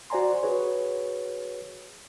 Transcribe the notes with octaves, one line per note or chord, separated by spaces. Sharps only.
F#4 C5 D5 G#5 A#5 C6
F#4 G#4 B4 C#5